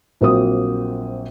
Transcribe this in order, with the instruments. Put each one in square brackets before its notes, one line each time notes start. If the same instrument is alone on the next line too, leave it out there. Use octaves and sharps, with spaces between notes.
[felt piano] A#1 F#3 A#3 C4 D#6